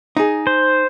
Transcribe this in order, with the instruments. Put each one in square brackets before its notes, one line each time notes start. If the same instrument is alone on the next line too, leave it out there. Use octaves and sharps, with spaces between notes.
[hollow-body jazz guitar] D#4 G#4
[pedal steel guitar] C5